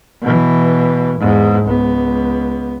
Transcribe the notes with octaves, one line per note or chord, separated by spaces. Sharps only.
B2 E3
E2 G#2
C#2 B3